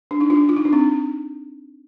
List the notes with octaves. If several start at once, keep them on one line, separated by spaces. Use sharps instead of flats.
D4
D#4
D4 F4
F4
D#4
D4
C4 D#4